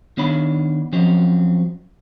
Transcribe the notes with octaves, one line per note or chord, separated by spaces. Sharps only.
D#3 B3 D4 C#5 B5
F3 F#3 C4 C#4